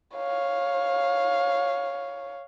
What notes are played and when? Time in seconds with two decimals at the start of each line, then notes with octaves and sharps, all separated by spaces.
0.15 C#5 F5